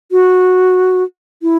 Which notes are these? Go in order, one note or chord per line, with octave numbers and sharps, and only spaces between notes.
F#4
E4